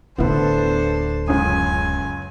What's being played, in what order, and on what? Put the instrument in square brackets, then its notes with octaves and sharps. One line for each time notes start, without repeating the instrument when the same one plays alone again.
[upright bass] D1 D3 [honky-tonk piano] B3 E4 B4 [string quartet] D4 A4 C5
[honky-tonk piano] C#2 C#4 D#6 [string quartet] F#2 G#5